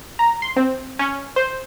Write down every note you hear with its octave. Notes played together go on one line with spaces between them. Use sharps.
A#5
C6
C4
C#4
C5